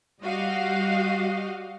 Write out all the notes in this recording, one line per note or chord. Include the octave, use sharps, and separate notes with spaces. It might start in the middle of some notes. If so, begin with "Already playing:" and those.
G3 F#4 G4 D#5 F5